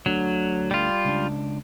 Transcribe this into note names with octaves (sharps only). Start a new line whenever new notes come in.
D2 D3 F#3
G3 F4
C#2 D4